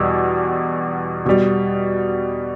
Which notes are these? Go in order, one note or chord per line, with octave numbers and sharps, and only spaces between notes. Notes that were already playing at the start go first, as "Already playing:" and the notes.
Already playing: E2 B2 G3 E6
B2 G3